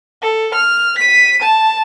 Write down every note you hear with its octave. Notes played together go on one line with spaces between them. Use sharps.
A4
F6
B6 D#7
A5